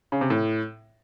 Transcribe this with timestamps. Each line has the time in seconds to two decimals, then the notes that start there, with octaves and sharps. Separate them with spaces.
0.12 C#3
0.21 C3
0.30 A2